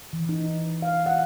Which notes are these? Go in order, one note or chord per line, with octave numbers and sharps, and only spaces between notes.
E3
D#4
F5
F#5